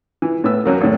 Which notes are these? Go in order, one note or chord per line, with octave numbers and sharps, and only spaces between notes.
E3
A2 B3 E6
F#2 F#3 A#3
G#1 A2